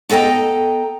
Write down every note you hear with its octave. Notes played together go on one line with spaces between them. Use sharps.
B3 A4 D#5 G5 A#5